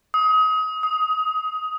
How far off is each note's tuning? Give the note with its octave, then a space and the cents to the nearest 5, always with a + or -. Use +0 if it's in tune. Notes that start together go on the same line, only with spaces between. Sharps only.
D#6 +30
D#6 +15